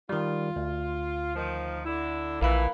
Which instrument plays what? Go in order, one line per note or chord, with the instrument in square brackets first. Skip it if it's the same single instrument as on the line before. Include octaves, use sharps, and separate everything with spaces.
[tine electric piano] D#3 G3 [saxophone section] F4
[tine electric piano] D2
[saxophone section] D#3 F3
D3 E4
[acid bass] A#1 [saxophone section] A#2 E3 E4 [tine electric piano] A#4 F5 B5